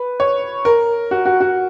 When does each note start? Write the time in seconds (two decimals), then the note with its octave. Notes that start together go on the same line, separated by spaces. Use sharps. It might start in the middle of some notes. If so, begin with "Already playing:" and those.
Already playing: B4
0.20 C#5
0.65 A#4
1.11 F#4
1.25 F#4
1.41 F#4